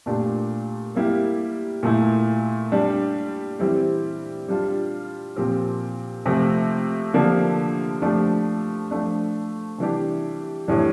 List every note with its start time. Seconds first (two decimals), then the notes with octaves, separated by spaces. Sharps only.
0.06 A#2 A3 D4 G4
0.95 G3 A#3 E4 G4
1.83 A#2 A3 E4
2.72 G3 D4 G4
3.59 E3 G3 C4 E4 G4
4.49 G3 D4 F4
5.36 A#2 F3 C4 G4
6.26 C3 F3 A3 C4
7.14 D3 F3 A#3 D4 G4
8.02 F3 A3 D4 G4
8.91 F3 A3 D4
9.78 C3 E3 G3 D4 G4
10.68 A2 E3 G3 D4